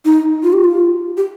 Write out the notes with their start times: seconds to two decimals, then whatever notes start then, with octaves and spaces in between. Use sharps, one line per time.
0.05 D#4
0.43 F4
0.53 G4
0.64 F4
1.17 G4